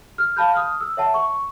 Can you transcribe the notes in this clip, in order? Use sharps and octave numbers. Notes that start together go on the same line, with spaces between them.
F6
F5 A5 B5 G6
D#6 F6
E6
C#5 E5 F#5 A5
C#6